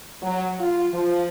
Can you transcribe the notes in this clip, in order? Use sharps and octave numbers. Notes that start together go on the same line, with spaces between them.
F#3
F4
F3